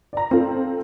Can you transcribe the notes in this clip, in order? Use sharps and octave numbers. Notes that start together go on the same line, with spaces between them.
D5 A#5
C4 F4 A4